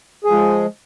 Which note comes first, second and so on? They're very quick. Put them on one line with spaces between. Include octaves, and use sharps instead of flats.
G#4 F3 G#3